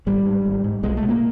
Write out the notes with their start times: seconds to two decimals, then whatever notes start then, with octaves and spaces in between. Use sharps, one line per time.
0.06 G#1 G3
0.26 G#2
0.46 G#1
0.64 G#2
0.83 B1 G#3
0.97 A3
1.02 B2
1.09 A#3